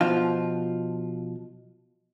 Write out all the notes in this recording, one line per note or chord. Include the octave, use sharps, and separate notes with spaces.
B2 F3 F4